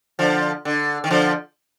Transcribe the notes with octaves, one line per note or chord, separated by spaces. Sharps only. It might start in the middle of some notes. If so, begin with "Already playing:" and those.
D3 F3
D3
D#3
D3 F3